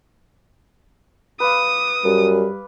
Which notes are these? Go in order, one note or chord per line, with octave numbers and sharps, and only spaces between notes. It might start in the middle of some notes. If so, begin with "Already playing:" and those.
B4 D5 F5 D#6
F#2 G3